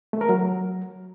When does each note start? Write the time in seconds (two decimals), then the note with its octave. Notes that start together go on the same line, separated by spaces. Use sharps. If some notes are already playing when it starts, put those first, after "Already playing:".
0.13 A3
0.21 A#4
0.29 F#3